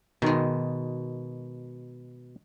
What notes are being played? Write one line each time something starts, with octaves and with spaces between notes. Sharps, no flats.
B2 D#3 G#3